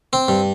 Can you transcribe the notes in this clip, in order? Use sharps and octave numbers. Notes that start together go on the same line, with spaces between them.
C4
G2